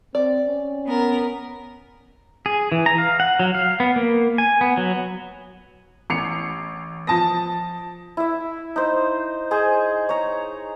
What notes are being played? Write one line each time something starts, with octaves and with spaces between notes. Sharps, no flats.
C4 D5
C#4
B3 A#4
G#4
E3
A#5
F5
F#5
F#3
F5
B3
A#3
G#5
B3
F#3
A1 C7 C#7 F7
F3 A5 D#6 A#6
E4 E5
D#4 C5
G#4 C5 D#5
C#5 A#5